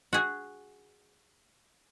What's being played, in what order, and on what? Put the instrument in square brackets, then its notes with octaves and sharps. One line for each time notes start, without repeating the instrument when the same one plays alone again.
[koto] F#4 G#4